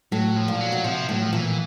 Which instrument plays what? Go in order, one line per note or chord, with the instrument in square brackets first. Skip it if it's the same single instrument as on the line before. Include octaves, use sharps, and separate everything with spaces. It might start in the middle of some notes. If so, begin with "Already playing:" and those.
[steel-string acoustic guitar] A2 [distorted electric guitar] F#3
[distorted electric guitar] F3
[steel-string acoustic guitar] A#2
[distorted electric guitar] F#3
[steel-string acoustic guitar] B2
[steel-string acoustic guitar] C3 [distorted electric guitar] F3
[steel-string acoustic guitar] A2 [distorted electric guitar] F#3
[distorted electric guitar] F3
[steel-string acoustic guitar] A#2 [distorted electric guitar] E3